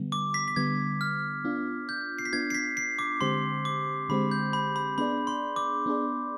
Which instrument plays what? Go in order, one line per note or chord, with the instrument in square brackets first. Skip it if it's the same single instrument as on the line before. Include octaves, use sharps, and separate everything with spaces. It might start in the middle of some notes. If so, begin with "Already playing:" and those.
Already playing: [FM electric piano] D3 G3 B3
[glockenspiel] D6
B6
B6
[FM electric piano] D3 G3 B3 [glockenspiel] G#6
[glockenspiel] F6
[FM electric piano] B3 D4 F4
[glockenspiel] G6
C7
B6
[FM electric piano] B3 D4 F4 [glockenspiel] G#6
[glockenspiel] C7
B6
C7
D6
[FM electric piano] D3 G#3 C4 G4 C5 [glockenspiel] C6
[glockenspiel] D6
[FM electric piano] D3 G#3 C4 G4 C5 [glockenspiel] B5
[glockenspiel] G6
B5
B5
[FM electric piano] B3 D4 G#4 D5 [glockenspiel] B5
[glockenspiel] C6
D6
[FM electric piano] B3 D4 G#4 D5